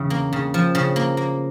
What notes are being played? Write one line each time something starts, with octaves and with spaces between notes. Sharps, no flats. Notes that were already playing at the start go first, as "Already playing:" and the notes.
Already playing: E2 C#3
A#3
C#3
F3
C#3
A#3
A#3